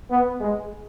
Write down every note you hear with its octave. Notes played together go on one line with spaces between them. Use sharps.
B3
G#3